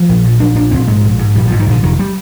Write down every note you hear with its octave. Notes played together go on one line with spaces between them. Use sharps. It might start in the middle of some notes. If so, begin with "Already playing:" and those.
Already playing: F3
A#1
A#2
A#1 D4
A#2 D4
A#1 C4
G#2 G#3
A#1
G#2
A#1 G3
G#2 F3
D#3
A#1 D3
F1 D#3
G3